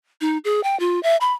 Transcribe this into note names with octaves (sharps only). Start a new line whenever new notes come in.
D#4
G#4
G5
F4
E5
B5